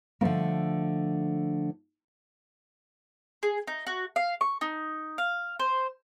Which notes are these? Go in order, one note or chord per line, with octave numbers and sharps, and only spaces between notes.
D3 F3 A3 A#3
G#4
D#4
F#4
F5
C#6
D#4
F5
C5